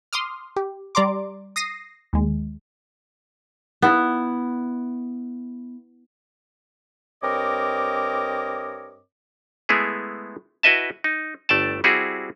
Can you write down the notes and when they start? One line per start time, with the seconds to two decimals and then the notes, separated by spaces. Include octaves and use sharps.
0.13 C6 D6 D#6 F6
0.56 G4
0.95 G3 D5 A#5 C6 D6
1.56 D#6 A#6 C7 D#7
2.13 D#2 G#3
3.82 B3 E4
7.23 G2 C4 A#4 C#5 D#5 D6
9.69 G#3 A3 B3 E4 G#4
10.63 E4 F#4 B4 D#5 E5 A5
11.04 D#4
11.49 G1 A3 D5 G5 A5
11.84 G3 C4 E4 F#4 G#4